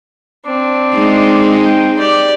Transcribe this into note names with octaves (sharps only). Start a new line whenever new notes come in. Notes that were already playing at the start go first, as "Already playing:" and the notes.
C4 D4
G#3 D#4
G5
G4 D5